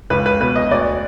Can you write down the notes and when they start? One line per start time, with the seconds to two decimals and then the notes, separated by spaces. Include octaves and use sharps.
0.10 C#2 B4
0.26 B4
0.40 B2 B4
0.56 D#5
0.71 D2 D5